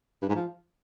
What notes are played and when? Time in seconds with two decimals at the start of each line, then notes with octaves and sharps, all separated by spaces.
0.23 G2
0.29 G#2
0.35 F3